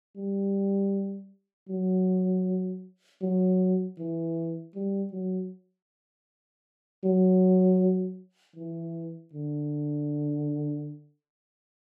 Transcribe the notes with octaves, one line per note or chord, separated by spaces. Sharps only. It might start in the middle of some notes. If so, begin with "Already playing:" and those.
G3
F#3
F#3
E3
G3
F#3
F#3
E3
D3